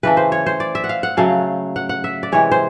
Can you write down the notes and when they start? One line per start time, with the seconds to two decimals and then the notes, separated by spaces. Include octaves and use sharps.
0.03 C#3 E3 A3 B4
0.17 C5
0.32 C#5
0.46 C5
0.60 D5
0.75 E5
0.84 F#5
0.89 F5
1.03 F#5
1.17 C#3 F#3 A3 F5
1.76 F#5
1.89 F#5
2.04 E5
2.23 D5
2.32 C3 E3 G#3 C#5
2.52 C5